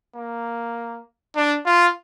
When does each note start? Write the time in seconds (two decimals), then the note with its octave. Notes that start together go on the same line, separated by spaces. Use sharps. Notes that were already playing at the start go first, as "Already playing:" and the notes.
0.16 A#3
1.36 D4
1.66 F4